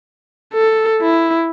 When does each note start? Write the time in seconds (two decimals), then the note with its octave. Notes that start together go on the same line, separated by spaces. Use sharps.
0.54 A4
1.02 E4